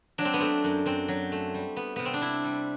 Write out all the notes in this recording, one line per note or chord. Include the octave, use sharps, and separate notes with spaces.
F#3 D4
C4
B3
A3 C4
F#2
F#2 C4
F#3
A3
G3
B3
C3 B3
C4
D4
C3 E4
G3